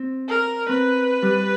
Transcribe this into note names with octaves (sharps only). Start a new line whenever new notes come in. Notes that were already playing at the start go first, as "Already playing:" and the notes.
Already playing: C4
A#4
C4 B4
G3